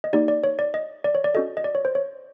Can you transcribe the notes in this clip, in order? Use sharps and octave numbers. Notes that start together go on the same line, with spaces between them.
D#5
A#3 D#4 G4 D5
D5
C#5
D5
D#5
D5
C#5
D5
C#4 F#4 A4 D#5
D#5
D5
C#5
C5
C#5